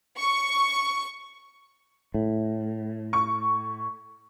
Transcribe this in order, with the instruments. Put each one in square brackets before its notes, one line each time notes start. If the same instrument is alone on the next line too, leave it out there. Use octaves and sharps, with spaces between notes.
[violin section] C#6
[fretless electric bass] A2
[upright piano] C#6